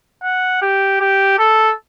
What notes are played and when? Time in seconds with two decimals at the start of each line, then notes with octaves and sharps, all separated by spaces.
0.23 F#5
0.61 G4
1.00 G4
1.39 A4